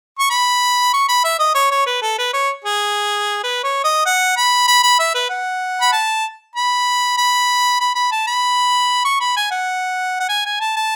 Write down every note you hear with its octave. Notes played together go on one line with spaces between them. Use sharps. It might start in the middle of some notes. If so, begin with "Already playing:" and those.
C#6
B5
C#6
B5
E5
D#5
C#5
C#5
B4
A4
B4
C#5
G#4
B4
C#5
D#5
F#5
B5
B5
B5
E5
B4
F#5
B5
A5
B5
B5
B5
B5
A5
B5
C#6
B5
G#5
F#5
F#5
G#5
G#5
A5
A5